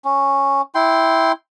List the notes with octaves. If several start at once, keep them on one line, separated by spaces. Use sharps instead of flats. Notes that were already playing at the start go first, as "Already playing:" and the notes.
C#4
E4 G5 C6